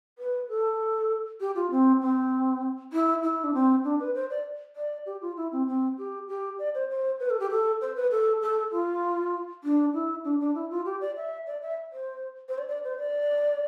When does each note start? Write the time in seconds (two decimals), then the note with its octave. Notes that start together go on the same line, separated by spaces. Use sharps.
0.18 B4
0.49 A4
1.40 G4
1.55 F4
1.71 C4
2.02 C4
2.93 E4
3.23 E4
3.44 D4
3.54 C4
3.84 D4
4.00 B4
4.15 C5
4.30 D5
4.76 D5
5.06 G4
5.22 F4
5.37 E4
5.52 C4
5.67 C4
5.98 G4
6.28 G4
6.59 D5
6.74 C5
6.90 C5
7.20 B4
7.30 A4
7.40 G4
7.50 A4
7.81 C5
7.96 B4
8.11 A4
8.42 A4
8.72 F4
9.64 D4
9.94 E4
10.25 D4
10.40 D4
10.55 E4
10.70 F4
10.85 G4
11.01 D5
11.16 E5
11.46 D5
11.62 E5
11.92 C5
12.48 C5
12.58 D5
12.68 D5
12.84 C5
12.99 D5